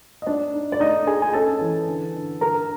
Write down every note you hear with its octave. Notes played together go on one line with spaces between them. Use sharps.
D#5
D4 D#4 D5
D#4
D5
A3 D#4 D#5
D4 G#4 G#5
G#5
C#4 A4 A5
E3
D3
D3
D3 A#4 A#5